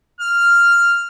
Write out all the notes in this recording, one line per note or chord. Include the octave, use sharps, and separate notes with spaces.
F6